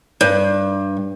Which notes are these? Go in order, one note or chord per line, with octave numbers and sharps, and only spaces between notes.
G2